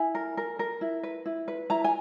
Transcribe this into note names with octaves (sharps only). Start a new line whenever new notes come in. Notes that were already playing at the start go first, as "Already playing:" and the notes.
Already playing: E4 G#5
A#4
A#4
A#4
E4
B4
E4
B4
E4 A#5
G#5